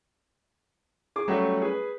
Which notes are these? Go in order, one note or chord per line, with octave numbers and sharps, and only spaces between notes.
G#4 D6
F#3 G3 A3 C#4 F#4 G4
G#4 B4